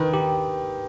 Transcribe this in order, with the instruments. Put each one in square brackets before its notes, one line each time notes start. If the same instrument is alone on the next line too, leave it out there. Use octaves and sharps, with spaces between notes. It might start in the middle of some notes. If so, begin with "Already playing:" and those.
Already playing: [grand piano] D#3 [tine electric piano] B4
[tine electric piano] G4